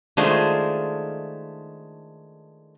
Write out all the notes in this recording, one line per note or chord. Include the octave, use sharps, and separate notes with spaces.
D#3 G#3 A3 D4 F4 C5